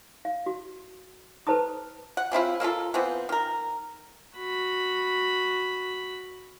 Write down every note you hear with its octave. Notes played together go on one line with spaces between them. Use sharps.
F5
F#4
A4 B4 C5 A5 A#5 D#6
F#5
C#3 C4 E4 F4
A#3 E4 F4 A4
E3 F3 B3 C4
D#3 A#4
F#4 B5